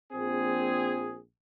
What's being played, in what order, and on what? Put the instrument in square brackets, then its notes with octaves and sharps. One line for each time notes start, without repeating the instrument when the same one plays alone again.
[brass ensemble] A#1 C4 G#4